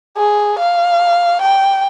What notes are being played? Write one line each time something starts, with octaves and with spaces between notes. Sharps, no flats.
G#4
F5
G5